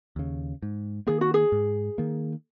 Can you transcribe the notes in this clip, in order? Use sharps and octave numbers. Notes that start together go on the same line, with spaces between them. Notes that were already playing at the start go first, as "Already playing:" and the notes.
D#2 C#3
G#2
D#3 A#3 G#4
F#4
G#4
G#2
D#3 A#3